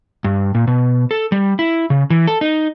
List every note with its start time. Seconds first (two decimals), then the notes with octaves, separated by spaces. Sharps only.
0.24 G2
0.55 A#2
0.67 B2
1.11 A4
1.32 G3
1.59 E4
1.90 C#3
2.10 E3
2.27 A4
2.41 D#4